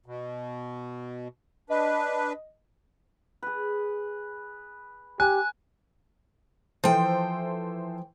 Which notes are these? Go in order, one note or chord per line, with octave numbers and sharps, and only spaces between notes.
B2
D4 B4 D#5
G#4 B4
G4 G#5 F#6
E3 F3 A4 C5 G5